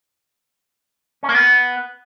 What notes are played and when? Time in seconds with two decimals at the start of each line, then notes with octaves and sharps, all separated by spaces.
1.23 C#4
1.29 A#3
1.35 B3